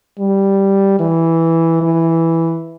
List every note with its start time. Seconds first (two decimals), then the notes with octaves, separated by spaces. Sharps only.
0.19 G3
1.00 E3
1.82 E3